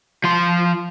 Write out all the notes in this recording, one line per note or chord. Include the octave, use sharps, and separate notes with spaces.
F3 C6